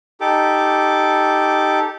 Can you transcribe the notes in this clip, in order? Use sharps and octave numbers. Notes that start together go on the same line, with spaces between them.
D#4 G4 A4 D6